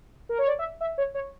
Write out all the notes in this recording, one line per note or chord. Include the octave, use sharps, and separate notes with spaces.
A#4
C#5
D5
E5
E5
C#5
C#5